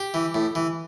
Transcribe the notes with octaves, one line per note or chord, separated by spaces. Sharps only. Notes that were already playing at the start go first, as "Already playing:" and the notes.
Already playing: G4
E3
A2
E3